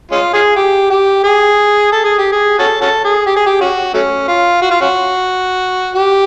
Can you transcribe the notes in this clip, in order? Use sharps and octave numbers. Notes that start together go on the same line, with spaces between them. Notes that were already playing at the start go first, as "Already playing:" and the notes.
G#3 C#4 F4
F4 G#4
G4
G4
G#4
A4
G#4
G4
G#4
C#4 F#4 A4
C#4 F#4 A4
G#4
G4
G#4
G4
C#4 F#4
F#3 A3 C#4
F4
F#4
F4
C#4 F#4
G4